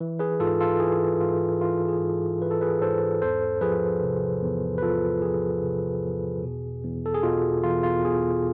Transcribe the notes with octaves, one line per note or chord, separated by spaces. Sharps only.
E3
G#4 B4
G#2 F4 A4
F4 A4
E3 G#4
G#2 F4
E3 F4
G#4
G#2
E3 B4
A4
G#4 B4
G#2 A4 C5
E2 A4 C5
F3 G#4 B4
C3
E2
B4
E2 F4 A4
F3 G#4
C3
E2
B2
E2
A4
G#4
B2 F4
E2 F4
F4
B2 G#4